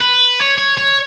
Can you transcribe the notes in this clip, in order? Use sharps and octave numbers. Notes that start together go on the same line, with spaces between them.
B4
C#5
C#5
C#5